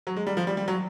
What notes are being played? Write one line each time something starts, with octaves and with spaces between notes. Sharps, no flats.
F#3
G#3
G3
F3
G3
G3
F#3